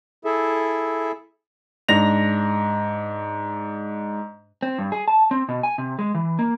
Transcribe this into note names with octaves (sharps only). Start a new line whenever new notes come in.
E4 G#4 A4 E5
G#2 D4 A#6 F7
C4
G2
G#4
A5
C4
B2
G#5
C3
G#3
E3
A#3